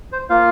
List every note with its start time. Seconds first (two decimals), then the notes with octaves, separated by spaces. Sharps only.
0.12 C5
0.30 A#3 F4 F5